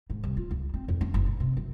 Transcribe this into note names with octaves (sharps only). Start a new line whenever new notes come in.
G#2
C2
F4
C#2
C4
F2
C#4
F#1
A#2
C3
F#2